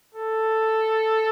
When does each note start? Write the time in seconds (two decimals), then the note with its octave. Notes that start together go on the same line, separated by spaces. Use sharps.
0.15 A4